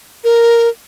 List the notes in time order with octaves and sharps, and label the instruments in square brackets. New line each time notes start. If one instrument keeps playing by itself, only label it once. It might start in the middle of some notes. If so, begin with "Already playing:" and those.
[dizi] A#4